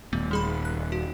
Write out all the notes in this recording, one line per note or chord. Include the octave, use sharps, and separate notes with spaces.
D#1 A3 B3
G3 G#4 B5
F#6
F#4